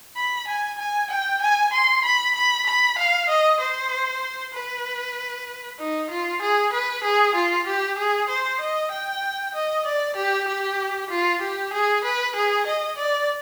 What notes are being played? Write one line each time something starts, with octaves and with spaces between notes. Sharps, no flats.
B5
G#5
G#5
G5
G#5
C6
B5
B5
B5
F5
D#5
C5
B4
D#4
F4
G#4
B4
G#4
F4
G4
G#4
C5
D#5
G5
D#5
D5
G4
G4
F4
G4
G#4
B4
G#4
D#5
D5